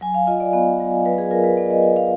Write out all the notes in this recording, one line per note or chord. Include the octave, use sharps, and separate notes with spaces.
F#3 G#5
F5
F4 D#5
D5
B3
F#3
F#3 B4
G#4
F4 A#4
B4
B3 D5
D#5
F4
F5